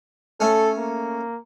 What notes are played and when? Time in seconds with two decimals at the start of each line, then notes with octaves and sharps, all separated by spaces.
0.40 A3 C#4 A4
0.79 A#3